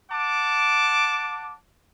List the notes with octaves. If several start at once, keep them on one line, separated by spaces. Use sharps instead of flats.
F#5 A5 D6